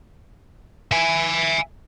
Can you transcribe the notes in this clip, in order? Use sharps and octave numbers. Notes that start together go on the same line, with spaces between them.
E5 G#5